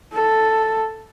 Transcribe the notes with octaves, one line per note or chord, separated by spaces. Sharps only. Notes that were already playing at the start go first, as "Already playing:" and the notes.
A4